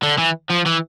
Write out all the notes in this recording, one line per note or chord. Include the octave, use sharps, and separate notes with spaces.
D3
E3
F3
E3